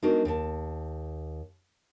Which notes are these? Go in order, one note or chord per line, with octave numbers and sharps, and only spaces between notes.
G#3 B3 D4 D#4 F#4 A#4
D#2 A5